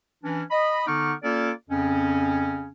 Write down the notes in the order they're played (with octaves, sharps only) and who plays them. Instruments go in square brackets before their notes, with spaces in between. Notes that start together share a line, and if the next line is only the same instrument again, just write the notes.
[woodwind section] E3 C#4 D4
D#5 B5
D3 B3 D#4 C#6 D6 F6
A#3 C#4 F4 A4 D5
F2 C#3 C4 C#4